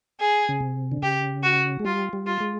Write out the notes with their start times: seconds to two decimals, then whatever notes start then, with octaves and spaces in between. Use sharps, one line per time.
0.20 G#4
0.49 C#3
0.60 C3
0.92 D3
1.02 C#3 G4
1.43 F#4
1.79 G#3
1.85 G3 F4
2.13 G3
2.26 F4
2.40 G#3